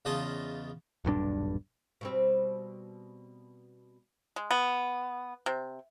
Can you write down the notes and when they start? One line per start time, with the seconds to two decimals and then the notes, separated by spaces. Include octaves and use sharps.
0.05 E2 C#3 F4 D#5 A5
1.05 D#1 B1 G2 D4
2.01 B2 G3 C4
4.36 G#3
4.51 B3
5.46 C3